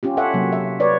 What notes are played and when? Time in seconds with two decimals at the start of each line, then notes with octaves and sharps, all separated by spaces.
0.03 C#4 F4 G4
0.17 A4 C#5 E5 F#5
0.34 C3 F#3 A#3
0.52 E5
0.80 B4 C#5 D5